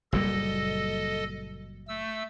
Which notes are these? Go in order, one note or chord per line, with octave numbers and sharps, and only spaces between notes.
F#1 A#2 G3 A4 D#5
A3 E6